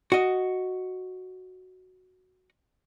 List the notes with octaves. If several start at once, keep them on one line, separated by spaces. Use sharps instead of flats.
F#4 D#5